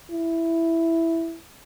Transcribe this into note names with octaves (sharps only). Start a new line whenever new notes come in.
E4